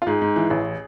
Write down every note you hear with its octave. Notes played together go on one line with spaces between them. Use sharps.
F4
G#2 G#4
G#2
E3
A1